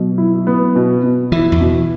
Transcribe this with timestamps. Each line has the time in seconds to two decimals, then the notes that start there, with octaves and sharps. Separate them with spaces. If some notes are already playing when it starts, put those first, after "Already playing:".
Already playing: B2 F#3
0.18 E4
0.47 B3
0.76 B2
1.04 B2
1.32 E3 E4
1.52 E2
1.61 B2